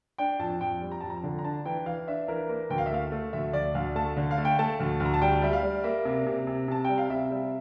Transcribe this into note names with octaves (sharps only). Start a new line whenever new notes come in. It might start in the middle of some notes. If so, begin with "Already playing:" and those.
D4 G5
F2 A5
F2 G5
G3
A#5
F2 A5
A#5
D3
A#5
D4 A5
E3 G5
E3 F5
D4 E5
E3 A#4
A#3
D2 G5
F5
E5
A3 F5
A3
D2 E5
D2 D5
D2 F5
A3 A5
D3
F5
A3
G5
A3 A5
D2
D2
A#5
A5
G3 G5
G3 E5
F5
G3
A#3 E5
C3
C3
C3
C3 A5
G3 G5
F5
C3 E5
G3